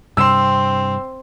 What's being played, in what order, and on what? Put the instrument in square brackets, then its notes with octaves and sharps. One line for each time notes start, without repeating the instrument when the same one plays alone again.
[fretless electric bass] G2 C3 [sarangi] C4 [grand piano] C6 E6